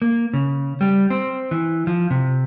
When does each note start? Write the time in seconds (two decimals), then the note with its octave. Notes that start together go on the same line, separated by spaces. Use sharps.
0.02 A#3
0.34 C#3
0.81 G3
1.10 C4
1.51 E3
1.87 F3
2.11 C3